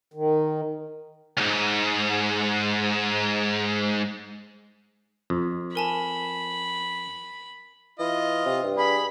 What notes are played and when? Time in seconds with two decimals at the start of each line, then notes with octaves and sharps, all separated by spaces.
0.14 D#3
1.37 C#2 G#2
5.30 F2
5.75 A#4 G#5 A5 B5
7.99 E3 F4 D#5
8.46 C3
8.63 G2
8.77 G#4 B5